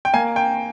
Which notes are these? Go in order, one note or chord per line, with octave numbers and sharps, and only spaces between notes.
G5
A#3 G#5
G5